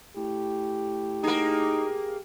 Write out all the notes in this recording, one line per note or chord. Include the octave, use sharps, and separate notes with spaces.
A2 G4
A#3 D#4 G#4